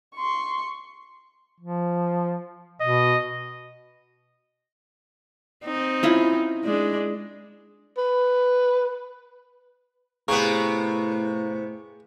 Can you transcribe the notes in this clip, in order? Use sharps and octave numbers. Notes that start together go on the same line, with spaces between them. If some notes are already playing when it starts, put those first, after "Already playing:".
C6 C#6
F3
B2 D#5
C4 D#4
C#4 E4 F4
G#3 D4
B4
A2 C3 B3 G#4 C#5 F5 A#5 C#6